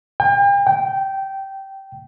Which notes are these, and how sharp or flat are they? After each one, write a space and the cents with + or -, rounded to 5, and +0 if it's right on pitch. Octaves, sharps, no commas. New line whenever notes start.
G5 +40
G5 -15